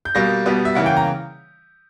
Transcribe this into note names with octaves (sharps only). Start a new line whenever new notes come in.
G6
B2 G3 A#3 A#6
B2 G3 B3
E5
C#3 E3 A#3 F#5
G5
A#5